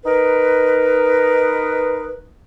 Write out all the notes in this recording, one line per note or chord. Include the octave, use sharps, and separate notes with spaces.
D#4 A#4 B4